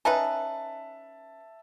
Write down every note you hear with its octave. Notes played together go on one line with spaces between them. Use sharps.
C#4 D#4 B4 E5 A5